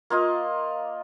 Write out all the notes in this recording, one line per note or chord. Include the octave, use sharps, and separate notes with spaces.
A#3 F4 D#5